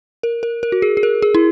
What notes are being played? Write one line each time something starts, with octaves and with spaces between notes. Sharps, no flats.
A#4
A#4
A#4
F#4
G#4
G#4
A#4
G#4
E4